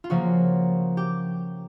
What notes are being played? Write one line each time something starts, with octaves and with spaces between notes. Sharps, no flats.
F4
C#3 F3 A#3 F#4
G4